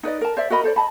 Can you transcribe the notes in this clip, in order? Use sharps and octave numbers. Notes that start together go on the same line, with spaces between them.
D#4 B4 D5 D#5
A#4 A5
C5 D5 E5
F#4 A#4 D#5 B5
A4 C5 D5
D#5 A5 B5